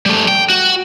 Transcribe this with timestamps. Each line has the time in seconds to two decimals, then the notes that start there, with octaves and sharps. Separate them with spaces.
0.06 G3 A3
0.28 G5
0.50 F#4